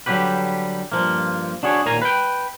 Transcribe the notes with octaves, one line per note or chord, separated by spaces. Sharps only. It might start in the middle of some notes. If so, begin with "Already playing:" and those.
D3 F#3 G3 G4 B4
G2 F3 A#3
D4 F#4 G#4 C#5
D#2 A#2 A#3 G#5 A#5
B4 G5